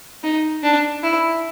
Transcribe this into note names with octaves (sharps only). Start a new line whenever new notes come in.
D#4
D4
E4